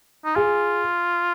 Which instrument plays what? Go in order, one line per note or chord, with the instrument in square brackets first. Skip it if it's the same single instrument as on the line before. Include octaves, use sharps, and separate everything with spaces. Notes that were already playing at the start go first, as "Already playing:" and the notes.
[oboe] D#4
[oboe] F4 [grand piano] G#4